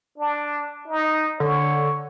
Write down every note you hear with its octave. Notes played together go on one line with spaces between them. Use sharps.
D4
D#4
D3 C#5